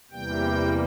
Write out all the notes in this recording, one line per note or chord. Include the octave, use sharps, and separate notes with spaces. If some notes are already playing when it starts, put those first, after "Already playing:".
E2 C3 E3 G3 A#3 G5